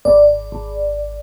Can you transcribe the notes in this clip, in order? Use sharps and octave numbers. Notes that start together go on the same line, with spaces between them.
G#1 D5
G#1